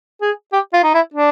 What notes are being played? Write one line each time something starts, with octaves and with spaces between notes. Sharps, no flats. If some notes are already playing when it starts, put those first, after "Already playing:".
G#4
G4
F4
D#4
E4
D4